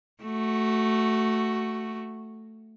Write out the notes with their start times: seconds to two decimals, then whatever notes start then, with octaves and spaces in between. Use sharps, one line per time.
0.24 A3 F#4